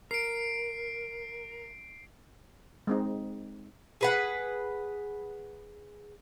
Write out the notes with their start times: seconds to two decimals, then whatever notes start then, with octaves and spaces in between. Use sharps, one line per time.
0.11 A#4 C7 D7
2.87 G#3 C4 D#4
4.01 G#4 B4 F#5